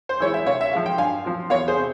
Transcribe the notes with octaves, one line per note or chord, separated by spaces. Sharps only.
C5
E3 G#3 E4 C#5
E5
C3 C#5 F5
E5
F3 G#3 C4 F5
G5
G2 F5 G#5
F3 C4 F4
E2 C#5 F5
G#4 C5
C3